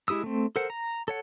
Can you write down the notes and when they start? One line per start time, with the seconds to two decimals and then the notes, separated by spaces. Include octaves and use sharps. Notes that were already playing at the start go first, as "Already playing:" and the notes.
0.08 G#3 E4 G4 D#6 E6
0.24 A3 C4
0.56 A4 A#4 C5 F#5
0.70 A#5
1.08 A4 C#5 F#5